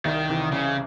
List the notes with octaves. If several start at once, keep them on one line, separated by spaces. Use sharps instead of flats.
C2 D#3
C3 E3
C2 C#3